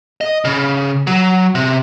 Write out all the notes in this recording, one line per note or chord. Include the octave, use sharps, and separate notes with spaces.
D#5
C#3
F#3
C3